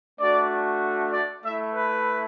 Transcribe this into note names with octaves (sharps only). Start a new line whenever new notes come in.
A3 D4 F#4 D5
D5
A3 E4 E5
B4